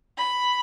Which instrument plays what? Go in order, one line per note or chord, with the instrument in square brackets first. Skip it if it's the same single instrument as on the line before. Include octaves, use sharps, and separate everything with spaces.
[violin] B5